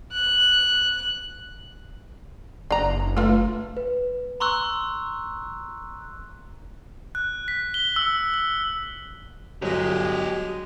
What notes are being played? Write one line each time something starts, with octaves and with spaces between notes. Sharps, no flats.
F#6
F#1 D4 A#5
A3 F4 A4 B4 C6
B4
A#5 C6 C#6 E6 F#6
F#6
B6
G7
E6
E6
G1 F#3 G#3 G4 G#4